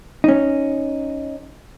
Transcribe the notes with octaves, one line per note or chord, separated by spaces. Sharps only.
C#4 D#4